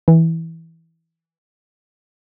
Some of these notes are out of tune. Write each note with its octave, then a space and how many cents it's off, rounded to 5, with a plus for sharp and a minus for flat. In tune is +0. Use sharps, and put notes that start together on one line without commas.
E3 -10